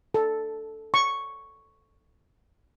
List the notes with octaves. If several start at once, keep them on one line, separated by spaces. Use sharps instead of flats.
A4
C#6